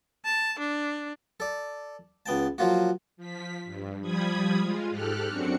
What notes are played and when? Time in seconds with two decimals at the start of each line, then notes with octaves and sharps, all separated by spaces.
0.25 A5
0.59 D4
1.40 A4 D5
2.26 C#2 B3 G5 A5
2.58 F3 F#3 A#3 F4 F#4
3.17 F3 B6
3.65 G2
4.02 F3 G3 B5 D#6 G#6
4.59 G#3 F4
4.90 G#2 G4 A4 F6 F#6
5.26 F#2 C4 D4 F#4 C#7